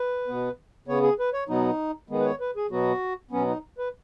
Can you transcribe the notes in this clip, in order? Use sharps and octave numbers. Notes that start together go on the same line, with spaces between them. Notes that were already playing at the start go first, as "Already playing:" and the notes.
Already playing: B4
B2 B3
C#3 B3 C#5
G#4
B4
C#5
B2 F#3 B3 D#4
D#3 G#3 B3
B4
C#5
B4
G#4
B2 F#3 B3 F#4
B2 F#3 B3 C#4
D#4
B4